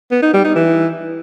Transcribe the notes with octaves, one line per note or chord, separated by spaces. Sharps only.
B3
D#4
G3
D#4
E3